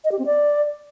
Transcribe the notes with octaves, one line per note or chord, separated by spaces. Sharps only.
D#5
G4
C4
D5